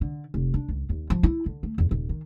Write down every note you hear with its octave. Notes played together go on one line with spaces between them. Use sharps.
D3
F1
D4
C#2
D#2
F3
E4
D3
A3
E2
D#1
D#3